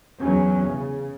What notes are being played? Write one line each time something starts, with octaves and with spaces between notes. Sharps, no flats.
E2 F#3 C#4
C#3